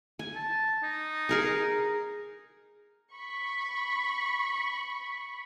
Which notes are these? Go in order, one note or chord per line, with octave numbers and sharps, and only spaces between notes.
G#5
A5
D#4
G#4 A#4 G#5
B5 C#6